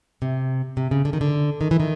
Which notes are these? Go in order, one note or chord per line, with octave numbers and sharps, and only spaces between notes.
C3
C3
C#3
D3
D#3
D3
D#3
E3
D#3